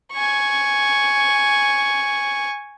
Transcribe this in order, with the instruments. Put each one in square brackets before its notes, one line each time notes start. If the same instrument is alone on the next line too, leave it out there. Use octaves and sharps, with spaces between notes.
[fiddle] G#5 C#6